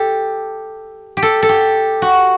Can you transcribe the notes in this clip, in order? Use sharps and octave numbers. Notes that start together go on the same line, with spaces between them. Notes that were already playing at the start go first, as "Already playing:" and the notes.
Already playing: G4 A4
G4
A4
A4
G4
F#4